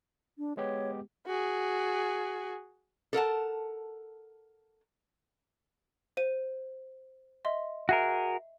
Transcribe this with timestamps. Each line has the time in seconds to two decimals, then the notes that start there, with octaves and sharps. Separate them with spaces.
0.38 D4
0.57 G#3 B3 G4 C#5
1.27 F#4 G#4
3.13 A4 A#4 F#5 A5
6.17 C5 D#7
7.45 D#5 E5 C6
7.89 F#4 G#4 A#4 E5